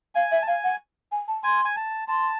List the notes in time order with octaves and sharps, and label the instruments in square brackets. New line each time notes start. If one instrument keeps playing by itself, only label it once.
[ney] F5 [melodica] G#5
[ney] E5
[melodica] A5
[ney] F5 [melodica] G#5
[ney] F#5
G#5
A5
[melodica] G#5 [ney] C6
[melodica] G#5
A5
[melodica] A5 [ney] C6